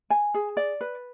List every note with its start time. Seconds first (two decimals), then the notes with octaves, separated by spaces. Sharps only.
0.10 G#5
0.34 G#4
0.57 D5
0.81 B4